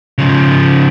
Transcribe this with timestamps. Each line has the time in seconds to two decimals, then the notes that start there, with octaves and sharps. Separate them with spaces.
0.18 C#3 F3